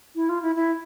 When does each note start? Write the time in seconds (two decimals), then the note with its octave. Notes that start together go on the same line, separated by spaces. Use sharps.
0.15 E4
0.29 F4
0.42 E4
0.55 E4